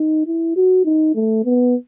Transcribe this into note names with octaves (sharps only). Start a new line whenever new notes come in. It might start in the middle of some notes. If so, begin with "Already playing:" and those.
Already playing: D#4
E4
F#4
D#4
A3
B3